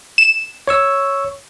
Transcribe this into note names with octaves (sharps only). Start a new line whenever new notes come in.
E7
C#5 C#6 E6